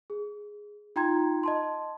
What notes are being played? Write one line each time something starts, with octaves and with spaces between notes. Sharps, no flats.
G#4
D#4 F4 G5 A#5 C6 G#6
D#5 A5 C6